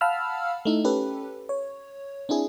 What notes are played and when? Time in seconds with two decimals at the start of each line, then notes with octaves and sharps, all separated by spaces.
0.01 F5 F#5 A5 B5 E6 F6
0.65 A3 D#4 E4
0.84 C#4 G4 A4 B4
1.49 C#5
2.29 C4 D4 E4 G#4